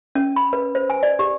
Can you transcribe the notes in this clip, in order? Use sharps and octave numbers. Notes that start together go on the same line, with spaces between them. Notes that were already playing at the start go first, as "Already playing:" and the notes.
C#4
B5
B4
C5
G#5
D5
G4